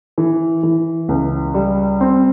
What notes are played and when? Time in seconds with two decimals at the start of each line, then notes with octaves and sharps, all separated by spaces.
0.18 E3
0.63 E3
1.09 C#2
1.54 G3
2.00 C4